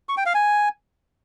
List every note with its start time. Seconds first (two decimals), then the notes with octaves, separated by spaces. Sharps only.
0.09 C#6
0.17 G5
0.26 F5
0.34 G#5